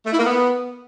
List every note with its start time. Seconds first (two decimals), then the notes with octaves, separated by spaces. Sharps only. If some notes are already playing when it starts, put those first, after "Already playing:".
0.06 A3
0.12 E4
0.19 A#3
0.25 B3